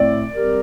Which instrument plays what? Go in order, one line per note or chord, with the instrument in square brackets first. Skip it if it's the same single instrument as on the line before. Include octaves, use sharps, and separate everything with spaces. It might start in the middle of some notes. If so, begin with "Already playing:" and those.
Already playing: [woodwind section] A2 A3 C4 [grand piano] D5
[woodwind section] G3 C4 G4 A#4